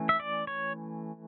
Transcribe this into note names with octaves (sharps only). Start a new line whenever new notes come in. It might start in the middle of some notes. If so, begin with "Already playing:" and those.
Already playing: E3 A3 C#4
E5
D5
C#5